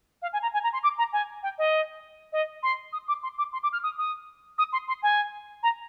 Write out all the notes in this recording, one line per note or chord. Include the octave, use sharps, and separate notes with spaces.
F5
G#5
A#5
G#5
A#5
C6
D6
A#5
G#5
G5
D#5
D#5
C6
D#6
D6
C6
D6
C6
D6
F6
D#6
D#6
D#6
C6
C6
G#5
A#5